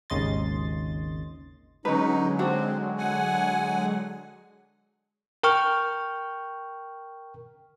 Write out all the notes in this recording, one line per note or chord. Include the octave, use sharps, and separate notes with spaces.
G#1 D#2 C#3 D#5 C6 A6
D3 F#3 G#3 C#4 D#4 B4
C4 D4 F#4
F#5 G#5
A#4 G5 C#6 F6